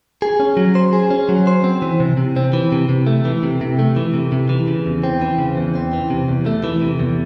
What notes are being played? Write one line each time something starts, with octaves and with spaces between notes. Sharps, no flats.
G#4
C#4
F#3
C5
G#4
C#4
F#3
C5
C4
E3
C3
C3
C4
E3
C3
C3
A3
E3
C3
C3
A3
E3
C3
C3
E3
C#3
E2
C4
E3
C#3
E2
C4
E3
C3
E2
A3
E3
C3
E2